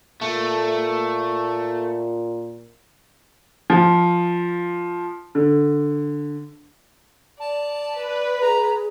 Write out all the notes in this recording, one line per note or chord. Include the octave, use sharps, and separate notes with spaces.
A#2 A3
F3
D3
D5 A5
B4
G#4 A#5